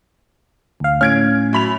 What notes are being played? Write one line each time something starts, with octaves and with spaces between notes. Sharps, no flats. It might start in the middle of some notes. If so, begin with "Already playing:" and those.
D2 F5
A2 C#4 F6 G#6 D7
F#2 B5 F7